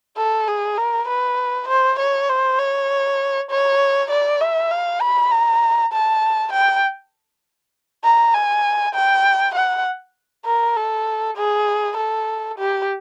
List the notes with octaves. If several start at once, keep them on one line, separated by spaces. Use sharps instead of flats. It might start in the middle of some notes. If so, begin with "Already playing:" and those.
A4
G#4
A#4
B4
C5
C#5
C5
C#5
C#5
D5
E5
F5
B5
A#5
A5
G5
A#5
G#5
G5
F#5
A#4
A4
G#4
A4
G4